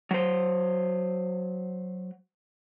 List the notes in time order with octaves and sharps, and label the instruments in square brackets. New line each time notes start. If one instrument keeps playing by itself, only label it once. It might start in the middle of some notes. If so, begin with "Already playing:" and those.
[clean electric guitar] F#3 C5